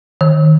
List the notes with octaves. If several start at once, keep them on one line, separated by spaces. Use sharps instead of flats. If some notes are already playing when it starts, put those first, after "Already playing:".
D#3